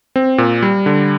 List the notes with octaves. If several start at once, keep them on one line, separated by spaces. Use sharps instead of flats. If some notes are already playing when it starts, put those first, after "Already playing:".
C4
A#2
G3
D3